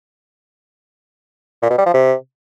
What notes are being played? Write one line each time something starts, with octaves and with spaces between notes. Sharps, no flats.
A#2
B2
G3
F3
C3